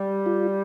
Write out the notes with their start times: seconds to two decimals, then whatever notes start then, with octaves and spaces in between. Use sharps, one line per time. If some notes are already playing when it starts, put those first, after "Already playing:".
Already playing: G3
0.26 F4